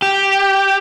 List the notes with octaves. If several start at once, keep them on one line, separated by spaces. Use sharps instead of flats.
G4